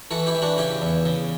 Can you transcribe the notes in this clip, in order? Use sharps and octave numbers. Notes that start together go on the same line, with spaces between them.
E3 F#4 A4
E4 G4
E3
D4 F#4
C#3 E4 G4
E2
C#3